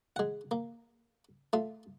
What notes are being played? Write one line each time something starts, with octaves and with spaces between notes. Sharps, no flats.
G#3 F#5
A#3
A3 F4